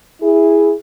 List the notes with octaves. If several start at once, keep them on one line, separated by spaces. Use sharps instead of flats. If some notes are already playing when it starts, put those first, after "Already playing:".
E4 G#4